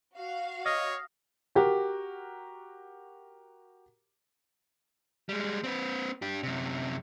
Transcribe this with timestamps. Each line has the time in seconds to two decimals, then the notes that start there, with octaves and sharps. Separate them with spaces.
0.17 F#4 F5
0.66 C#5 D#5 D#6 F6 A#6
1.55 F#4 G4 A#4
5.29 G3 G#3
5.64 C4 B4
6.22 D4 G4
6.43 F#2 C3